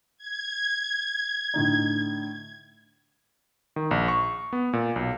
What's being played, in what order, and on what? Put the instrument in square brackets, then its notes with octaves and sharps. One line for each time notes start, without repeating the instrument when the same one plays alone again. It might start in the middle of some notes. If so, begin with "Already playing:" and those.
[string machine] G#6
[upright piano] A2 D3 D#4
[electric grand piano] D#3
A#1
C#6
B3
A#2
B1